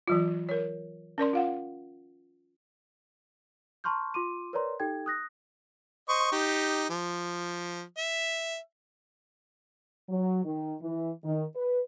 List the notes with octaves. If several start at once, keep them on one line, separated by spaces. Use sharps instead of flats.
E3 F#3 F4
A#4 C#5
C#4 A#4 D5 C6
F4 F5 F#5
A5 A#5 C6 C#6 F6 G6
F4 C6 D6 D#7
A#4 B4 C#5 D5 A#5 C6
D#4 G4 A4 G5 G#6
D#6 F#6 A#6
C5 D#5 C#6
D#4 G4
F3
E5
F#3
D#3
E3
D#3
B4